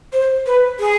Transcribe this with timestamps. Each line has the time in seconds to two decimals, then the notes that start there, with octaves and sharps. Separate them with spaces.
0.13 C5
0.46 B4
0.80 G#4